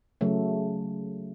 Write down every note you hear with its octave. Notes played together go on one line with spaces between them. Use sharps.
C#3 F#3 A3